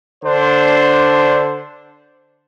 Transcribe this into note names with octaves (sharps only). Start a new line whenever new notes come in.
D3 D4 C5